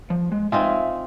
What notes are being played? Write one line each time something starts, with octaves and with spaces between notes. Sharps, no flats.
F3
G#3
C4 D#4 F4 E5 G#5